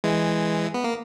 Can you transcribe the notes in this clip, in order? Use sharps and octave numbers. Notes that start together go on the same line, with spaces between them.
E3 G#3
B3
A#3